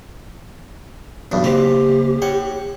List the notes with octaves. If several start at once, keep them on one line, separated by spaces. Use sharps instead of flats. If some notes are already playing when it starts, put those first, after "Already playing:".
B1 E2 G2
C#3 A#3 C4 G4
C#5 F#5 G5